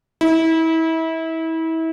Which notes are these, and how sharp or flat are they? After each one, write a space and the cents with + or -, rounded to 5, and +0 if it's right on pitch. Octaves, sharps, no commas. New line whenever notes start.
E4 -30